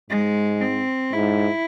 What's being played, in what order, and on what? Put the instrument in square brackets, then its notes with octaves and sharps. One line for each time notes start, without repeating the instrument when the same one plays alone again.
[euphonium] G#2 [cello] G#3
[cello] C4
[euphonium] G#2 [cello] E4